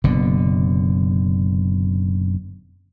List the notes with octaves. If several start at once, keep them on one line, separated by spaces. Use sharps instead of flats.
F#1 B2 D3